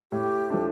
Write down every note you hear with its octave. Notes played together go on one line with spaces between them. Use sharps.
A2 G4
F3 A3 D4